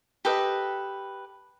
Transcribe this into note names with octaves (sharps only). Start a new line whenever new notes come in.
G4 A4 B4 D#5